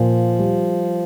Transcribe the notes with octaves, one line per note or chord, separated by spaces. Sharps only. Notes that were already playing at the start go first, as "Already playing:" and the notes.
Already playing: A#2 F3
G3